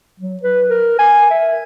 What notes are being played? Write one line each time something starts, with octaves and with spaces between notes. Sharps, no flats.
F#3
B4
A#4
G#5
E5